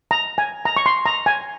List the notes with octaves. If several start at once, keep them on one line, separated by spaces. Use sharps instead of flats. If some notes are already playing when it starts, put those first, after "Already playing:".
A#5
G#5
A#5
C#6
C6
A#5
G#5